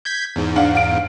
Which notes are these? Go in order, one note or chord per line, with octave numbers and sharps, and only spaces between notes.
G6 G#6 B6
E2 G#2
D4 F5 F#5
F5 D7